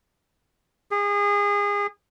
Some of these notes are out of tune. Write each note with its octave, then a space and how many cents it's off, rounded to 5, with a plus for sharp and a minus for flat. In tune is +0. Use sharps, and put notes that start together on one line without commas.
G#4 -30